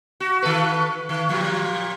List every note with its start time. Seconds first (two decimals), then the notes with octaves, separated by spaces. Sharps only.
0.20 F#4
0.42 D#3 A4 B4
1.09 D#3
1.29 A#2 F3 G3